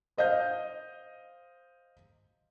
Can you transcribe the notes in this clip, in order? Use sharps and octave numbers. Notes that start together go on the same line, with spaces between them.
C5 D#5 F5 G6